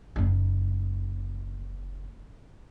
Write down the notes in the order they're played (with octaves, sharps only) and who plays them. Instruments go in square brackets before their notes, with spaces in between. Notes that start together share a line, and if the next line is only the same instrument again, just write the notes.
[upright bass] F#1 D#4